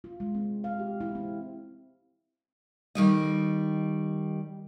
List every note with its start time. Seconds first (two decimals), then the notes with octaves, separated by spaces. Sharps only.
0.04 F4
0.20 G#3
0.35 C4
0.64 F5
0.79 G4
1.00 E4
1.15 C4
2.95 D#3 G3 D#5